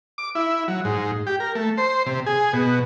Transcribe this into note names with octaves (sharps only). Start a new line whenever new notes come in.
D6
E4
F#3
G#2
G4
A#4
A3
C5
C3
G#4
B2